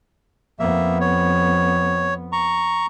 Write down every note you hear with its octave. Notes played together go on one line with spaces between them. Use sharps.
F2 A#3 B3 E5
C#5
A#5 C#6